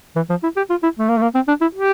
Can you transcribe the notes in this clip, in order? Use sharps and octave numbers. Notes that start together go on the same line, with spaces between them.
E3
F3
E4
G4
F4
E4
A3
A#3
A3
A#3
C4
D4
E4
G4